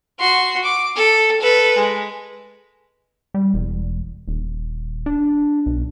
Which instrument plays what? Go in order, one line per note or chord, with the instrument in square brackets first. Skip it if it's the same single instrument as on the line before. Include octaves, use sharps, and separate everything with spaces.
[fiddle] F#4 C6
D6
A4
A4 B4
G#3
[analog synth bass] G3
E1
D#1
D4
B1